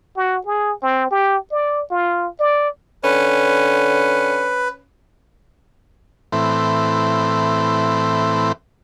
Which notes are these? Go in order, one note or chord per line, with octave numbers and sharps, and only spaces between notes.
F#4
G#4
C4
G4
D5
F4
D5
D3 C#4 B4
A2 E3 C4